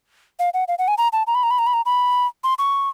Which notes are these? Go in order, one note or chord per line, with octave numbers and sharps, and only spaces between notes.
F5
F#5
F5
F#5
G#5
A#5
A5
A#5
B5
A#5
B5
A#5
B5
A#5
B5
C6
C#6